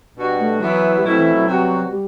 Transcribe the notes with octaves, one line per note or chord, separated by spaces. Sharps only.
B2 G3 D4 F#4
A3
E3 F#3 B3 E4
G3
B2 F#3 A3 C4 E4
E3
F#3
C3 G3 B3 F#4
G3